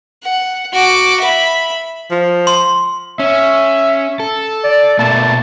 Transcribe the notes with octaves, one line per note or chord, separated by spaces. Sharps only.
F#5
F#4 D6
E5 B5
F3
C6
C#4 E5
A4
D5
B2 A3 A#3 A5